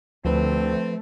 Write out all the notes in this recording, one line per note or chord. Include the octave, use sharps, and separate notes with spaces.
D2 F3 A3 C4 B4